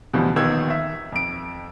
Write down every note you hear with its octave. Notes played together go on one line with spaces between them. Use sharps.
D2 B2 E3 F3 G3
D#1 D#2 D#3 B3 E6 G#6
E5
F2 D7